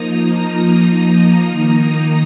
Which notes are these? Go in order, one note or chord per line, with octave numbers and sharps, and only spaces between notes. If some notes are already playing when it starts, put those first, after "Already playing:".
Already playing: F3 A#3 D#4 A#5 D#6
D#3 A#3 D#4